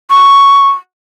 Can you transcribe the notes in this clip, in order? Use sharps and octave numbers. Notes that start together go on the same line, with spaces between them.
C#6